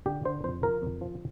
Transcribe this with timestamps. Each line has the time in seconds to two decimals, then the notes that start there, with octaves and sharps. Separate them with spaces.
0.06 D3 G4
0.25 D3 C5
0.44 F2 C5
0.63 F3 A#4
0.82 F2
1.01 F3